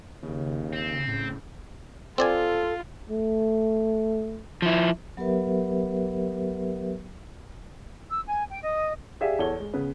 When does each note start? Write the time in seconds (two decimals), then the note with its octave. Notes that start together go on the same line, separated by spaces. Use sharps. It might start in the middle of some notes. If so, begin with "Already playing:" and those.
0.23 D#2 C#3
0.73 C4
1.08 A2 C#3
2.18 C4 F4 A4 D5 G#5
3.09 A3
4.62 F3 E4
5.17 F#3 B3 G4 A#4 B4 E5
8.10 E6
8.26 G#5
8.50 G5
8.63 D#5
9.21 G4 G#4 D5 E5 F5
9.39 E2 A4 C#5 G7
9.60 G#3
9.74 C#3 B3 B4